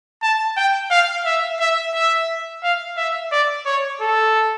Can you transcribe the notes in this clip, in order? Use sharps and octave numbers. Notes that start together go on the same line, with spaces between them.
A5
G5
F5
E5
E5
E5
F5
E5
D5
C#5
A4